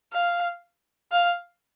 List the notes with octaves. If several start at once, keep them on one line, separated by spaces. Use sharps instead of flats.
F5
F5